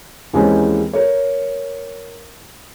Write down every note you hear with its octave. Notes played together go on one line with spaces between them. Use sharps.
D#2 E3 G#3 C4 C#4 D#4
A#4 C#5